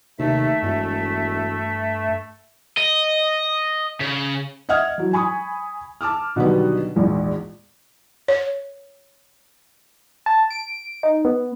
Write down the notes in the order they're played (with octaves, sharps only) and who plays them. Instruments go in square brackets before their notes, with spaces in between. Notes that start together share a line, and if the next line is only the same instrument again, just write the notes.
[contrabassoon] D#2 [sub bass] C3 [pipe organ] A3 E5
[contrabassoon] E1 [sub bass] G2
[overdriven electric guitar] D#5
C#3
[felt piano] D#5 E5 F#5 D#6 F6 G#6
E3 F#3
G#5 B5 C#6 D#6
A5 D6 E6 F6
B2 D3 D#3 F#3 G3 B3
A#1 E2 G#2
[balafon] C#5
[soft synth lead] A5
D7
D#4
B3